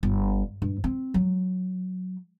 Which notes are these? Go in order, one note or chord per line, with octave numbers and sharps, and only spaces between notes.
G1
G2
C4
F#3